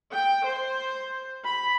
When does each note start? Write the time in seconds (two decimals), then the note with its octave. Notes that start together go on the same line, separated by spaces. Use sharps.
0.12 G5
0.45 C5
1.44 B5